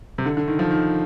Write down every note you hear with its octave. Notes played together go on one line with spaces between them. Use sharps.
C3
D3
D3
D#3
F3
D#3